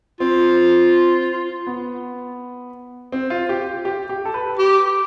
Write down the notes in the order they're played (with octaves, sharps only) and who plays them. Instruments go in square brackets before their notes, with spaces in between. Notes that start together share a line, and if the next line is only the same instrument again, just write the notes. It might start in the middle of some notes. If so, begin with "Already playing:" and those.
[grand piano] C4 [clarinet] F4
[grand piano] B3
C4
F4
G4
G4
G4
A4
B4
[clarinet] G4